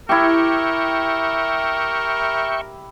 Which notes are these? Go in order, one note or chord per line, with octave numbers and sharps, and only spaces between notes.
E4 G4 A#4 E5 G5 C#6